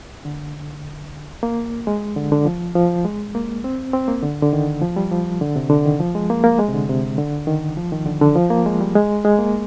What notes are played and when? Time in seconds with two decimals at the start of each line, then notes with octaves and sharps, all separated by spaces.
0.25 D3
1.43 A#3
1.87 G#3
2.16 D3
2.32 D3
2.45 F3
2.75 F3
3.05 G#3
3.35 A#3
3.64 C4
3.93 C4
4.08 A#3
4.23 D3
4.42 D3
4.53 D#3
4.82 F3
4.96 G3
5.12 F3
5.41 D3
5.56 C3
5.70 D3
5.86 D#3
6.00 F3
6.15 G#3
6.30 A#3
6.44 A#3
6.59 G#3
6.69 C3
6.74 D3
6.89 C3
7.18 D3
7.47 D#3
7.77 F3
7.92 D#3
8.06 D3
8.21 D3
8.36 F3
8.50 A#3
8.66 G#3
8.81 G3
8.95 G#3
9.25 G#3
9.39 A#3